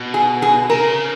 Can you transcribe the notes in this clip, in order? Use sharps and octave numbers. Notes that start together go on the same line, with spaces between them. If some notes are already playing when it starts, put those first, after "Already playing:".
Already playing: B2
G#4
G#4
C#3 A#4